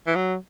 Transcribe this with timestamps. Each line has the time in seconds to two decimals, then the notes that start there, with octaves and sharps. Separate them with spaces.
0.07 E3
0.15 F#3